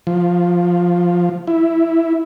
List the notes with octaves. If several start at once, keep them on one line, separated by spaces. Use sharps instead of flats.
F3
E4